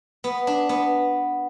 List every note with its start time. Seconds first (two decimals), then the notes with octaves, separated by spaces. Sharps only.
0.24 B3
0.47 D4
0.69 B3